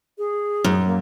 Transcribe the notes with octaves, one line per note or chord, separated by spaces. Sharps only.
G#4
F#2
A#3